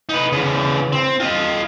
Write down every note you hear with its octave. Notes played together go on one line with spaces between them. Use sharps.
D#4 B4
C#3 E3
C4
F4 D#5